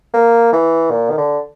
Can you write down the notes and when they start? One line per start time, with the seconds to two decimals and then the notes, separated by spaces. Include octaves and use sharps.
0.14 A#3
0.53 E3
0.91 A#2
1.10 D#3
1.18 D3